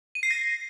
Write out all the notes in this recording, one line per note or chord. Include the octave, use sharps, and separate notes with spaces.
D#7
C7
A#6